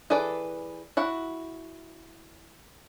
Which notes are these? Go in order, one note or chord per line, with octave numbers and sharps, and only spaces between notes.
E3 G#4 A4 B4 D5
E4 F#4 F#5